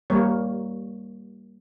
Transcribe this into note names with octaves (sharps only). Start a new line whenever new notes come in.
G3 A#3 C#5